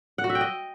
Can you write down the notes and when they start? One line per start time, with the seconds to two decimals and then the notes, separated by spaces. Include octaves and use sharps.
0.18 F#5
0.24 F#4
0.30 E5
0.35 G5
0.41 D#5